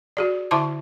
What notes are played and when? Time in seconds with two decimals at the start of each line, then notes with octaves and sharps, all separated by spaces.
0.17 F#4 G#4 D5
0.51 D3 E4 E5 A5 C6 D6